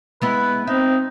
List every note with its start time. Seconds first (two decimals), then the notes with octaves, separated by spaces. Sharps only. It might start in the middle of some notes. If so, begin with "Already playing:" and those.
0.22 G#3 B3 E4 B4
0.67 C4 D#4 E5